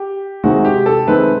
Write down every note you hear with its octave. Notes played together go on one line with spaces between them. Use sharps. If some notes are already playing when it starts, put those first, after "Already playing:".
Already playing: G4
C3 D#3 G#3 C4 D#4 F#4
G4
A4
C3 D#3 G#3 C4 D#4 B4